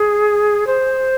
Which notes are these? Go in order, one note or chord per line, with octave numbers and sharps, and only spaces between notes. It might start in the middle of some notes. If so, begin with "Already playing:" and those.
Already playing: G#4
C5